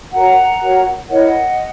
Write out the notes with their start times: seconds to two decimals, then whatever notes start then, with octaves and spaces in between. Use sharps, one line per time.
0.13 F#4 A#4 C#5 F#5 A#5
0.61 F#4 A#4 C#5
1.10 E4 A#4 C#5 D#5 F#5